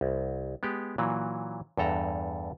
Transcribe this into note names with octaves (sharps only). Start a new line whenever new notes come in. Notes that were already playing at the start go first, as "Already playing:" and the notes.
C2
G#3 B3 G4
A#2 E3 F#3
E2 G2 A4 A#5